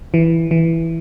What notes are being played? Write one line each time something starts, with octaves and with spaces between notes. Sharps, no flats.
E3
E3